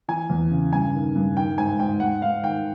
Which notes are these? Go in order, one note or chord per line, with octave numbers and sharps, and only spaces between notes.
E3 G#5
E2
C#3
G2 G#5
D#3
G2
D#3 G5
G#2 G#5
G#2 G5
G#2 F#5
G#2 F5
D#3 G5